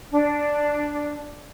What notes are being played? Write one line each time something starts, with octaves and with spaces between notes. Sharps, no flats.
D4